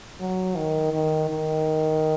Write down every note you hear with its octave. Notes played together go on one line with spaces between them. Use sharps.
F#3
D#3
D#3
D#3